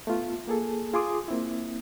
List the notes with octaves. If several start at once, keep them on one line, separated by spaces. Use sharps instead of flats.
A3 B3 F4
A#3 G#4 A4
F4 G#4 C6 D6 D#6
A#3 C4 E4